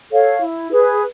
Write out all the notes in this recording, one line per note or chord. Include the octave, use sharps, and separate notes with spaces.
A4 C#5 F5
E4
G#4 B4